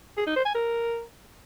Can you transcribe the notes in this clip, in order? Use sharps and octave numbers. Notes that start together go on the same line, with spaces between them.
G#4
D#4
C5
G#5
A#4